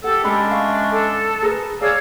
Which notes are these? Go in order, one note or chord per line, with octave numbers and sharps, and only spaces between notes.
G4 A4 F#5
G#3 C#4 D4 A4 B5
E5 F5 C#6
A4
G#4 A#4 B4
G#4 C#5 D5 F5 E6